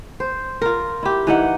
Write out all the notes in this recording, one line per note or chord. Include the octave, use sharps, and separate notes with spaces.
C5
F4 A#4
E4 G4
E3 D#4 F#5